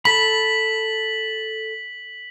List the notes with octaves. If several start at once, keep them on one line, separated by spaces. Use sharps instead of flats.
A4 B5 B6 F#7